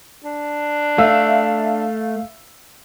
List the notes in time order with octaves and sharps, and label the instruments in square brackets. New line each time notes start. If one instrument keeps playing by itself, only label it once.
[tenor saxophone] D4
[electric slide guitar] A3 [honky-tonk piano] E5 F5 E6